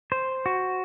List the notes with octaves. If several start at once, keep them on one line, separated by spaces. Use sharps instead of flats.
C5
F#4